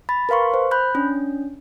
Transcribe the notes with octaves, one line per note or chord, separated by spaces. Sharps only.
B5 A6
A#4 B4 F5 C6 C#6
C5
B5 F#6 G6
C#4 D4